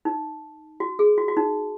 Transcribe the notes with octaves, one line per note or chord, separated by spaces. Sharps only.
D#4
F#4
G#4
F#4
F#4
D#4